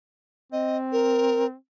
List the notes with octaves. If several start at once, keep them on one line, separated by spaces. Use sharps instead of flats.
C4 D#5
A#4